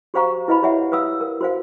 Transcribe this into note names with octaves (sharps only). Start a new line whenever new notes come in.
F#4 G4 C5 F5 A#5 C#6
E4 B4 D#5 F5 B5
G4 C#5 E5 F#5
B4 F5 D#6 E6
A#4
F#4 C5 F5